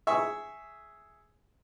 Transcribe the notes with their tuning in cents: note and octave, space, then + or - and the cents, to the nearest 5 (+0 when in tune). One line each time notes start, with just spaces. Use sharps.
G#4 +5 E5 +0 C#6 +0